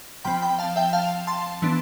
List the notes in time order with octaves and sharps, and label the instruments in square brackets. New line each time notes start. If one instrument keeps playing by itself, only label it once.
[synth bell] F3 C4 G5 B5
G5 B5
F5 A5
E5 G5
F5 A5
A5 C6
E3 B3 D4